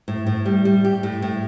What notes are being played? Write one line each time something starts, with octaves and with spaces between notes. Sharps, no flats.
A2
A2
G3
G3
G4
A2
A2